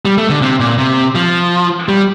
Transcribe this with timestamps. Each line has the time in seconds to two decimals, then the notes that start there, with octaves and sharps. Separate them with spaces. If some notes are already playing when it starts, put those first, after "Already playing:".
0.05 G3
0.18 A3
0.30 D3
0.42 C3
0.60 A#2
0.78 C3
1.15 F3
1.89 G3